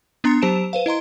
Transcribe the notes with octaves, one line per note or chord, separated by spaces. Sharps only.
B3 D4 A#5 C6 A6 C#7
F#3 G4 C5 A5 D7 E7
B4 C5 F5
E4 D#5 A#5 C6